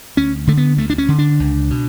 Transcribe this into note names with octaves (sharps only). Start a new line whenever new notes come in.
D2 C#4
D3 A3
B3
D2 A3
D4
C#4
D3
D4
C#2
B2